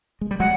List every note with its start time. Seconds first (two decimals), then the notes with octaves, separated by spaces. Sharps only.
0.21 G#3
0.31 G3
0.40 F#3 G#3 F#5